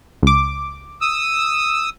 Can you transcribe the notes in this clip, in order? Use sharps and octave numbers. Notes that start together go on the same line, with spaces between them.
C#2 D6
D#6 E6